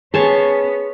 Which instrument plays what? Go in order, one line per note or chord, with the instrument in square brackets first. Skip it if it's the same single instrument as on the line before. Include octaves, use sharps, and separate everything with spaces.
[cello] B3 C#4 [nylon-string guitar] G#4 [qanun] C#5 A5 C6